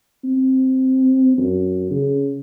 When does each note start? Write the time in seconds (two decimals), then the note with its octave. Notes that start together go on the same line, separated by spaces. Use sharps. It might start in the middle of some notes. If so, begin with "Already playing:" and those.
0.24 C4
1.38 F#2
1.90 C#3